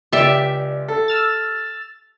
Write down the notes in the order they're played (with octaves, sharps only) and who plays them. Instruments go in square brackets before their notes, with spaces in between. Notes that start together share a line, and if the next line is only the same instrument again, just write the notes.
[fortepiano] C#2 [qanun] G4 E5 [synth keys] D5
[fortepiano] A4
[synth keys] E6 F6 A6